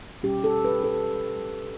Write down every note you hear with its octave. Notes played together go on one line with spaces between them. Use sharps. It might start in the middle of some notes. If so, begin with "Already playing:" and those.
B2 G3 C#4 G4
A4
B4
A4